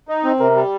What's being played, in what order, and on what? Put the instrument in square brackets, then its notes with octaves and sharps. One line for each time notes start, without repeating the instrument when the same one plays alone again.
[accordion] D#4
C4
[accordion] C3 [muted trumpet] A#4
[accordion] G3